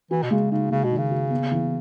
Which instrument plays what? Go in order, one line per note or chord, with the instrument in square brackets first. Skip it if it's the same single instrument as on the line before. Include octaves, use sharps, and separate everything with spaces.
[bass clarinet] E3 [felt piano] F#4
[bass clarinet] B2
[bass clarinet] C#3 [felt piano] G#3
[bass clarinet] C#3 [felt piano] D#4
[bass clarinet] C#3 [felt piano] G#3
[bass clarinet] B2
[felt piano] D#3
[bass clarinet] C#3
[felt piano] F#4
B3
E3